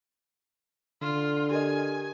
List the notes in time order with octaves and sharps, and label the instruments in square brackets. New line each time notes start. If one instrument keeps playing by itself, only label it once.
[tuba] D3 [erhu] F4
[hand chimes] G4 A#4 D#5 [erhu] G#5